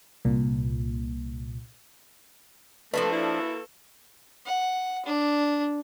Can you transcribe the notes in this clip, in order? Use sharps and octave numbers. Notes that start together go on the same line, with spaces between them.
C2 A#2
F3 G3 A3 A#3 D4 F#4 A4 B4
E4
F#5
D4